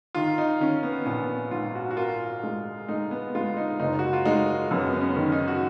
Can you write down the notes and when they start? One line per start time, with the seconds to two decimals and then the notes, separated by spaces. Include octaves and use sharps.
0.15 D#3 F4
0.38 D#4
0.60 D#3 C#4
0.83 B3
1.06 A#1 B3
1.51 G#2 F4
1.75 F#4
1.91 F#4
1.97 F4 A#4
2.43 G#3
2.89 G#3 D#4
3.11 B3
3.35 G#3 F4
3.57 D#4
3.79 F#1 D#4
3.99 F#4
4.13 F4
4.25 G#3 D#4
4.71 F#2 B3
4.92 B3
5.01 C#4
5.17 D#3
5.32 D#4
5.48 F#4